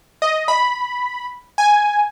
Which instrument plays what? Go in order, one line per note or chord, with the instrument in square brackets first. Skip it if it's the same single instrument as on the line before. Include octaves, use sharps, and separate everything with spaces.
[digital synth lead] D#5
B5
G#5